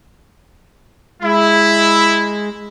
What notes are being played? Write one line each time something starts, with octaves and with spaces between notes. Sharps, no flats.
G#3 E4